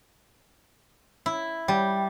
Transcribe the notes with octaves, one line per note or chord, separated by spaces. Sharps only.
E4
G3